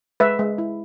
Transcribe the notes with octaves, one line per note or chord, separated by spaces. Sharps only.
G#3 B4 E5
G#3
E4